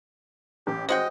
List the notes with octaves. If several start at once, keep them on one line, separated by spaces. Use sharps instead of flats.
A1 G4
G#3 F#4 C5 D#5 G5